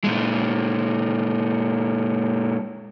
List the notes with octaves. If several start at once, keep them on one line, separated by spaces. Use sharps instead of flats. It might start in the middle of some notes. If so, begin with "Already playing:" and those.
A#2 G#3